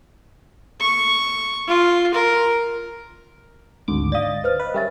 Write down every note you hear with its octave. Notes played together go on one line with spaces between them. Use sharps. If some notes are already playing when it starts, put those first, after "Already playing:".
C#6
F4
A#4
G#1 D2 D6
D5 D#5 F5 A6
B4 C5 F6
B4 D#5
G3 C#4 A#4 E5 A6